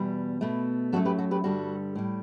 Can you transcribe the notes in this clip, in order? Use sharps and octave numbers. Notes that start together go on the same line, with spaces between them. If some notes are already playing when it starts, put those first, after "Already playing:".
Already playing: E2 B2 G3
B2 A3
F#2 F#3 A3 F#4 A4
G4 B4
F#4 A4
G4 B4
G2 D3 G3 F#4 A4
A2 G3